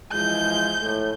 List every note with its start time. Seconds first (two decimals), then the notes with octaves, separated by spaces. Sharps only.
0.13 E3 F3 G#3 G6
0.78 A2